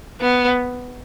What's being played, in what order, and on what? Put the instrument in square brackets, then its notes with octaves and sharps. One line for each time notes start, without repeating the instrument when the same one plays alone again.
[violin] B3